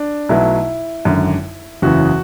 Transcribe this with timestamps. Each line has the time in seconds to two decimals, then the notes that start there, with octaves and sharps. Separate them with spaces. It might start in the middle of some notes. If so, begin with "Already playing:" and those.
Already playing: D4
0.29 B1 B2 F#3 A3 E4
1.05 G#1 F#2 D3
1.82 F#1 E2 C#3 E3 F#4